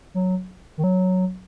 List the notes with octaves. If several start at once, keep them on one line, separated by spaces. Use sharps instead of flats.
F#3
D#3
F#3